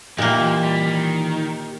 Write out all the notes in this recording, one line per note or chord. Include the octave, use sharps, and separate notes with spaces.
A#2 A#3 D#4 E4 G4
E3 F3 D#5
G3
D#3